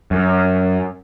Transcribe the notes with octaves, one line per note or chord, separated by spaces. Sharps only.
F#2